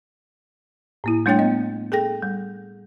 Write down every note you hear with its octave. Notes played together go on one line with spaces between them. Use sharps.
A2 A#3 E4
G3 A3 D4 C#5 G5 A6
B3 D#5
G#4 A4 G5 A#6
G3